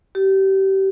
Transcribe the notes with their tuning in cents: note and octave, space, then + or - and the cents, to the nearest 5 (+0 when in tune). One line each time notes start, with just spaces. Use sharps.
G4 -25